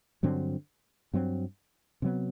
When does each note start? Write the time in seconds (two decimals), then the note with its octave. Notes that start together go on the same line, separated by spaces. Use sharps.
0.23 G2 D3 F#3 C4
1.13 G2 F#3 C4
2.02 C3 F#3 B3